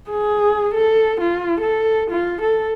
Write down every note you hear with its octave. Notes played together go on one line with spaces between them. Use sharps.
G#4
A4
F4
A4
F4
A4